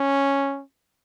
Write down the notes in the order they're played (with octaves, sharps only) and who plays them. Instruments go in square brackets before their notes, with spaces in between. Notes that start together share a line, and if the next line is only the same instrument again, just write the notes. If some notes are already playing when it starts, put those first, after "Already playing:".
Already playing: [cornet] C#4